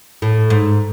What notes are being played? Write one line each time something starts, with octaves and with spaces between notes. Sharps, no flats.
A2
G#2